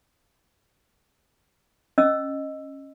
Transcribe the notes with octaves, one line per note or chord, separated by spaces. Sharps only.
C#4 D#5 E6